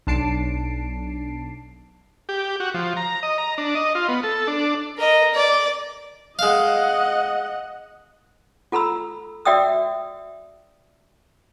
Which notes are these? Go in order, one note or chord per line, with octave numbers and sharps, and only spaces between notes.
B1 D4 A5 C7 D7
G4
F#4
F3
A#5
D#5
A#5
D4
D#5
F4
B3
A4
D4
A#4 D#5
D5
G#3 D#5 F5 F#5
F4 A4 A#5 B5 E6
F#4 D5 E5 G5 D#6 E6